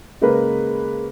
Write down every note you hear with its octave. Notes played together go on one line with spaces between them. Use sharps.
C#3 G#3 A#3 B4